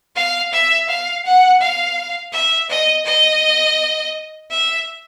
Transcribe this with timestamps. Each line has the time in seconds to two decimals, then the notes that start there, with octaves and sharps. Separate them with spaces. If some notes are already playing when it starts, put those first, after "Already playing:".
0.16 F5
0.52 E5
0.89 F5
1.25 F#5
1.61 F5
2.33 E5
2.70 D#5
3.05 D#5
4.50 E5